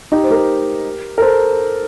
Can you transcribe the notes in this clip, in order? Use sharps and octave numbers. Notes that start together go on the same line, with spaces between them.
D#4 G4
C5
G4 A#4
A#4
A4 C5